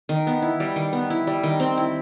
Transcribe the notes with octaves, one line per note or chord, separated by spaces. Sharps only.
D#3
B3
E4
G3
D#3
B3
E4
G3
D#3
C4
E4